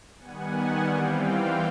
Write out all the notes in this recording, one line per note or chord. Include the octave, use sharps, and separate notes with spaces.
D#3 G3 B3 F#5 G#5
E3 G3 C4 F5 G5